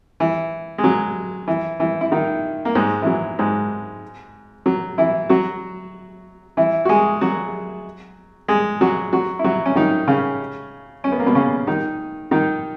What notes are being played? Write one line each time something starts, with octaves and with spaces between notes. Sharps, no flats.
E3
G#3
F#3
E3
E3
E4
D#3 D#4
A#3
G#2 G#3
E3
F#3
G#2 G#3
F#3
E3 E4
F#3 F#4
E3 E4
F#4
G#3 G#4
F#3 F#4
G#3 G#4
F#3 F#4
F#3 F#4
E4
F#3 F#4
C#4
D#3 D#4
C#3 C#4
C#4
B3
A#3
B2 B3
C#3 C#4
D#3 D#4
D#3 D#4